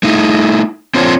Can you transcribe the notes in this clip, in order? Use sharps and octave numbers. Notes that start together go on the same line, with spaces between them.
A3 D#4 E4
C4 D4 F4 C5 C#5